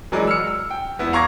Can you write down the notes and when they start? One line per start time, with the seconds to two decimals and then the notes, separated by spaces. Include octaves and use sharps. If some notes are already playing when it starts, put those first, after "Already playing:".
0.12 E3 F#3 G#3 A#4 D5 D#5
0.27 E6 F6 C#7
0.47 E6
0.70 G5
0.99 E2 B3 E4
1.13 F5 A#5 C#6 D6 G#6 A#6